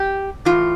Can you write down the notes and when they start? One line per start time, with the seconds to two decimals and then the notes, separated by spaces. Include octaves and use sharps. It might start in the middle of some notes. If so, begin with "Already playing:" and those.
Already playing: G4
0.45 A2 E3 F4